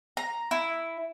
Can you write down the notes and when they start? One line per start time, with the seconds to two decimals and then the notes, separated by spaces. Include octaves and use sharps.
0.17 A#5
0.51 E4